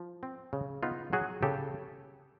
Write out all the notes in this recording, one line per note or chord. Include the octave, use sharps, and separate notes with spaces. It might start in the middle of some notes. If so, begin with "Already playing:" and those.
Already playing: F3
C4
C#3
B3 D#4 F4
F#3 F#4 G#4
C#3 G4 A4